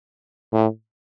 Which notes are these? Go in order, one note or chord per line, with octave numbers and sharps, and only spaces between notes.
A2